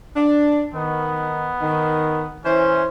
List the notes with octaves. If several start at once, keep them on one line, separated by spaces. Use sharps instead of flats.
D4
D#3 B3
D#3
E3 C#4 E4 C5